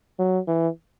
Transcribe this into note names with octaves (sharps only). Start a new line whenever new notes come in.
F#3
E3